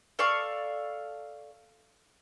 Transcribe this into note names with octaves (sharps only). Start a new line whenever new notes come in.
A4 D5 F5 C#6